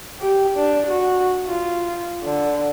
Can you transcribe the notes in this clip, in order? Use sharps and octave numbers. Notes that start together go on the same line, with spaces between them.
G4
D4
F#4
F4
D3